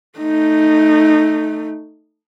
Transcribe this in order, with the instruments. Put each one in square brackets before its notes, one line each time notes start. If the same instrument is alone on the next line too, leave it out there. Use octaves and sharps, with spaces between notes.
[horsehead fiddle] A3 D#4